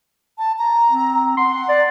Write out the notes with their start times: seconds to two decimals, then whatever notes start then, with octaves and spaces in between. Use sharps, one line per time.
0.38 A5
0.59 A#5
0.89 C4
1.37 F#5 C6
1.69 D5